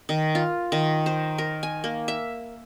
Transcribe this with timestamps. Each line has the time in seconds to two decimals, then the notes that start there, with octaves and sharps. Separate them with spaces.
0.09 D#3
0.35 F4
0.72 D#3
1.06 C5
1.38 A#4
1.63 G#5
1.84 A#3
2.08 E5